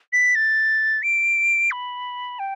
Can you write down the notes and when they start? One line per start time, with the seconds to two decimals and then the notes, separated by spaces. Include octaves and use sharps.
0.13 B6
0.35 A6
1.03 D7
1.71 B5
2.39 G5